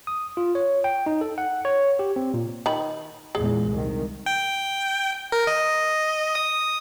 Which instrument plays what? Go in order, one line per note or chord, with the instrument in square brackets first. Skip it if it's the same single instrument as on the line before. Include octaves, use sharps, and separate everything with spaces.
[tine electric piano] D#6
F4
C#5
G5
D#4
A4
F#5
C#5
G4
C4
A#2
[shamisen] D#3 B5
[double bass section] E2 A#2 G#3 [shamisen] G#4
[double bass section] C2 D#3
[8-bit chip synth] G5
A#4
D#5
D#6